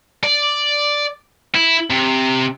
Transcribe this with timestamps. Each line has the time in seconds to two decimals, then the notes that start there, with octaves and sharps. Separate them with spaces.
0.23 D5
1.55 E4
1.90 C3